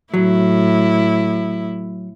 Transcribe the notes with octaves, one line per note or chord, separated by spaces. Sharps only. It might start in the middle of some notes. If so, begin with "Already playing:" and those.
A2 F#3 E4